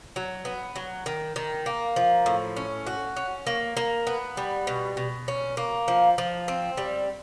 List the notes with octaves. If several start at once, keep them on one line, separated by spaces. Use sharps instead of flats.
F#3
B3
F#3
D#3
D#3
A#3
F3
A2
C#4
F#4
C#4
A#3
A#3
B3
G3
B2
B2
C#4
A#3
F3
F3
C4
G3